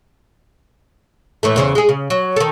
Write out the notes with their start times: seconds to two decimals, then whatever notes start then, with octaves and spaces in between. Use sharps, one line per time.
1.43 A2 E3 A3
1.56 E2 C#3 C5
1.75 G#3 G#4
1.89 C#3
2.10 F#3
2.36 D#3 A4